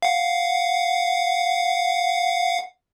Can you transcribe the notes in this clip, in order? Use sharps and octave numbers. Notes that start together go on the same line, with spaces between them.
F5 F#5